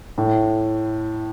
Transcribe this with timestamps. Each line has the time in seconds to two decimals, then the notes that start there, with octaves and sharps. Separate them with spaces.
0.18 A2